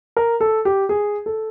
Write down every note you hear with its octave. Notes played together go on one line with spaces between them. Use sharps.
A#4
A4
G4
G#4
A4